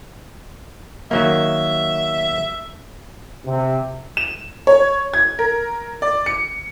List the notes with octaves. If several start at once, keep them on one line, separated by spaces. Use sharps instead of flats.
D#3 F#3 A#3 E5
C3
E7
C#5
G#6
A#4
D5
C#7